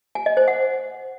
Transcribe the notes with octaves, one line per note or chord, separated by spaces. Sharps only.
G#5
D#5
C5
F#5